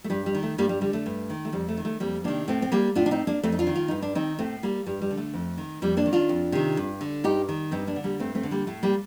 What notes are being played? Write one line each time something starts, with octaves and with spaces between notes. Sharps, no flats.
A3
G2 G3
G3
D#3
A3
G2 G3 A#3
G3
D3 G3
A3
G2
D#3
A3
F2 G3
A3
D#3
A3
F2 G3 A#3
C3 D#3 A#3 D4
A2 A3 C4
C4
G3 A#3
A2 D4 F4
D4
C4 D#4
A#3 D4
F2 A3 C4
D#4
D4 F4
D#3
F4
G2 D#4
D4
D#3 C4 D#4
A2 A3 C4
G3 A#3
G2 G3
G3
D3
A3
F2
D#3
F2 G3 A#3
A#3 D4
D#3
D4 F4
F2
C3 D#3
G2
D3
G2 D#4 G4
D#3
G2 C4 D#4
A#3 D4
D3
G3 A#3
G2 A3 C4
A3 C4
D3
G3 A#3
A2 A3
G3 A#3